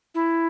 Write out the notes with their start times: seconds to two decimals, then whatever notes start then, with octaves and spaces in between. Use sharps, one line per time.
0.15 E4